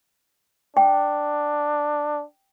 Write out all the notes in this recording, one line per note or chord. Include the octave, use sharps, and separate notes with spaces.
D4 G5